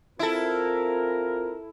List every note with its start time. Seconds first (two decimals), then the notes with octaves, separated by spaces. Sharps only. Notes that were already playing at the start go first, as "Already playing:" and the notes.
0.19 C4 E4 F4 A4 A#4